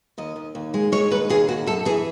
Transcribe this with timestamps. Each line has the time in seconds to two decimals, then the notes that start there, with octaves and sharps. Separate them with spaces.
0.18 D#2 D#5
0.36 D#2
0.55 D#2
0.74 G#3
0.92 G#3 C#5
1.11 D#2 B4
1.29 D#2 G#4
1.48 D#2 F#4
1.66 F#2 A4
1.85 E3 G#4